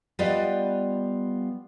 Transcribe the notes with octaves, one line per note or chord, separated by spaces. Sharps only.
G3 B3 F4 B4 D5 D#5